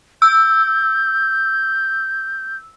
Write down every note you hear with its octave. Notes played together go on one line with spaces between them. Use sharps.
E6 G6